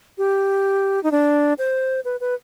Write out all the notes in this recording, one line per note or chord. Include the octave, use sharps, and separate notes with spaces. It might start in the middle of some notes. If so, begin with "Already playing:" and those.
G4
D#4
D4
C5
B4
B4